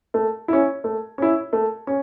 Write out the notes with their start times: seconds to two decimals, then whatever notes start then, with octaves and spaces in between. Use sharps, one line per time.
0.14 A3
0.48 C#4 E4
0.84 A3
1.18 C#4 E4
1.53 A3
1.87 C#4